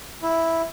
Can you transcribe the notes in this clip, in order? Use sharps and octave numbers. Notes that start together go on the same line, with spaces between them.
E4